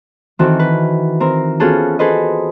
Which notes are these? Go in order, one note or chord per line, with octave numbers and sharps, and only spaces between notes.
D#3 E3 C4 F#4 A4
B4
C4 A#4
B3 C#4 F4 F#4 G#4 A4
G#4 A4 B4 C5 D#5